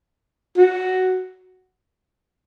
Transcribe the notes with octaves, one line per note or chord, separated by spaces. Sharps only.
F#4